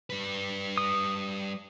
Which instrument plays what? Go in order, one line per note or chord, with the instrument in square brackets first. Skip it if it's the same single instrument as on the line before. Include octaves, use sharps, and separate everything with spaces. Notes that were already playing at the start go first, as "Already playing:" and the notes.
[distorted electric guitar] G3 B4
[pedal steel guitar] D#6